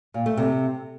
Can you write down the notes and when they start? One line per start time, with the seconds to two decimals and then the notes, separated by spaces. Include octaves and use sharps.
0.14 A#2
0.26 A3
0.37 C3